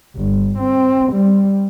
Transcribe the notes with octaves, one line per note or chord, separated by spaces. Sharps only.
G1
C4
G3